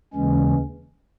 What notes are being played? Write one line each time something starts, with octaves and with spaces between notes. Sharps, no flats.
D#2 C#3 E3 G#3 C#4